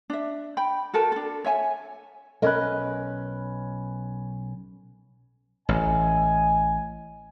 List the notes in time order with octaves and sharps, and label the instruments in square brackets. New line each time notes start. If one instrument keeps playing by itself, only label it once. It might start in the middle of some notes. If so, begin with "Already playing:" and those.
[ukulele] D4 E5
G5 B5
F#4 A4 A#4 A5
D4 A4
C#5 E5 G#5
[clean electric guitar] B1 C#4 B4 [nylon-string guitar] A#4 D#5
[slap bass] A1 [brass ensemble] D#5 G#5